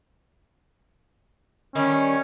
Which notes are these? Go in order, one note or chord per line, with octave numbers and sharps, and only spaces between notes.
D#3 G3 C#4